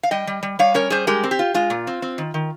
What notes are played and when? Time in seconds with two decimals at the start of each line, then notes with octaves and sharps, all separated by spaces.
0.03 F5
0.11 G3 D#5 G5
0.27 G3
0.43 G3
0.59 G3 C#5 F5
0.74 C#4 A#4 C#5
0.90 G3 G#4 C5
1.07 G#3 G4 A#4
1.24 C4
1.31 G4
1.39 F4
1.54 G#3 F4
1.70 A#2
1.87 C4
2.02 C4
2.18 D#3
2.34 D#3